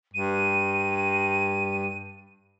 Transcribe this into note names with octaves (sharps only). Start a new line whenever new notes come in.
G2 D#7